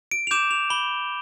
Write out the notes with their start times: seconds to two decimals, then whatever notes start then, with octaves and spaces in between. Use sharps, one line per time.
0.11 D7
0.27 F7
0.31 D6 G6 E7
0.51 F7
0.70 B5 G7